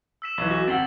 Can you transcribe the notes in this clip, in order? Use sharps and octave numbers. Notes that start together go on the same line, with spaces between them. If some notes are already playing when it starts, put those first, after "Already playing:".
E6 B6 E7
B1 E3
F#4
G1 C4 F#5 A6 F#7 G7